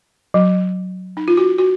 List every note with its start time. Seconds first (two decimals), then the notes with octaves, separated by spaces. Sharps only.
0.34 F#3
1.17 D#4
1.28 F4
1.37 F#4
1.58 F#4